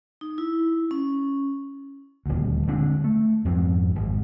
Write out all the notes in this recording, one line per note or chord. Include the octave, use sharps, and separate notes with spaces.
D#4
E4
C#4
D#1 D2
D3 G#3 C4 D4
A3
F2 G#2 F3 C4
G#1 G#3